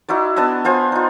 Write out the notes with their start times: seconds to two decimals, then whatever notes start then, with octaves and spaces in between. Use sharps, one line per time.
0.09 D#4 E4 F#4 D5
0.36 B3 D4 D#5 E6
0.64 B3 F4 C5 G#5
0.92 D#4 F4